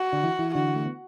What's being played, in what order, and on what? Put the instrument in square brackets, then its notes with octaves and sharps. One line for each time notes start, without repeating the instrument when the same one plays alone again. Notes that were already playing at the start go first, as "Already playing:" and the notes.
Already playing: [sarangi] F#4
[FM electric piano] D3 D4
E3 E4
E3 E4
[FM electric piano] D3 D4 [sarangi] F#4
[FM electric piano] A3
B3